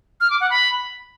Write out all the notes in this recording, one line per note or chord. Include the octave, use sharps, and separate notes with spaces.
F6
D6
F#5
B5